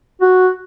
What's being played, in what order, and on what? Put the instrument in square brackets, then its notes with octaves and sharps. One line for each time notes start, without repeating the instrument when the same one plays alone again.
[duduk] F#4